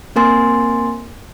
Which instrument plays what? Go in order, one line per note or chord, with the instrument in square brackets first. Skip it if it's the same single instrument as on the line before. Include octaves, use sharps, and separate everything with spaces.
[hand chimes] A#3 C4 A#4 G#5 C6 A6